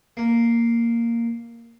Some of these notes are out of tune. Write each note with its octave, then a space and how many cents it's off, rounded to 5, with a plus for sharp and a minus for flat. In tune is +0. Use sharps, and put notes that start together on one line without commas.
A#3 -5